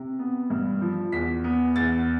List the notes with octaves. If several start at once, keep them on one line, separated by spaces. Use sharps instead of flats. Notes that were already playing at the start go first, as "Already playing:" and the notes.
Already playing: C3
B3
G2
F3
E2 B6
B3
E2 A6